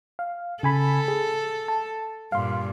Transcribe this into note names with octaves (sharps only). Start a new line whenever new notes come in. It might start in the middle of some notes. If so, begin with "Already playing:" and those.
F5
C#3 A4 G#5 B5
G#4
A5
G2 A#2 F5 C6